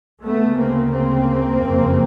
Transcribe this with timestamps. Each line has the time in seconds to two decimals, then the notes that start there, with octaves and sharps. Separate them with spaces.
0.24 D2 C#3 A3 B3
0.58 A#3 C4
0.92 A#3 C4
1.59 F#1 F2 C#3